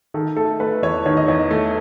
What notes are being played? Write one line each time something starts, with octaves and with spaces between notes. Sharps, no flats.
D#3 A4
A3 A4
A3 B4
E2 C#5
D#3 C#5
D#5
E2 C#5
A3